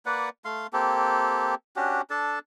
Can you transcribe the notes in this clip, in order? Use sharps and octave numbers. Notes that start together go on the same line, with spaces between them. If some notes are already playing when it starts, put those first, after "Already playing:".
A#3 B4 D5 F#5
A3 F5 C6
A#3 C4 G4 A4
C#4 D4 F#4 G4
D4 A4 A5